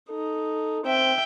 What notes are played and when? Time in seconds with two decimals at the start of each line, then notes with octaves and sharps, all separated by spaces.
0.10 D#4 A4
0.85 C4 E5 G5